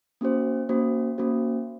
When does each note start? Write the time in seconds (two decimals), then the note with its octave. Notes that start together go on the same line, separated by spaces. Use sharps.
0.21 A#3 C#4 F#4 C5
0.69 A#3 C#4 F#4 C5
1.18 A#3 C#4 F#4 C5